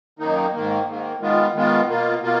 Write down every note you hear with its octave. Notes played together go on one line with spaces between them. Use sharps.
F#2 D#3 A#3 D#4
G#2 D#3 A#3
G#2 D#3 A#3
D#3 G#3 B3 F4
D#3 G#3 B3 F4
B2 A#3 F4
B2 A#3 F4